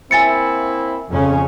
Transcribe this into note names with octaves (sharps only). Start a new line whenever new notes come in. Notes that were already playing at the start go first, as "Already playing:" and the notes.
A#3 C4 E4 G#5 A6 C#7
F2 C#3 C#4